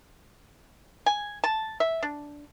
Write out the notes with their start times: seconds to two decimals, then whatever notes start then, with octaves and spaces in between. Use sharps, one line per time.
1.06 G#5
1.44 A5
1.80 E5
2.03 D4